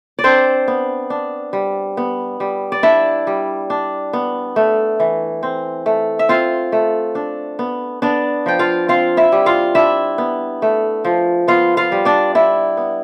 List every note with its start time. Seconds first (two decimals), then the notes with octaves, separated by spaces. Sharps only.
0.19 D5
0.24 C4 D4 C5
0.68 B3
1.10 D4
1.53 G3
1.97 B3
2.40 G3
2.72 D5
2.83 D4 E4 E5
3.27 G3
3.70 D4
4.13 B3
4.56 A3
5.00 E3
5.43 C4
5.86 A3
6.19 E5
6.29 C4 F4 F5
6.72 A3
7.15 D4
7.59 B3
8.02 B3 D4 D5
8.46 F3 G5
8.59 F4 F5
8.88 C4 F4 F5
9.17 E4 E5
9.32 G3
9.46 F4 F5
9.75 D4 E4 E5
10.18 B3
10.62 A3
11.05 F3
11.47 B3 F4 F5
11.77 F4 F5
11.92 G3
12.05 D4 D5
12.35 D4 E4
12.77 B3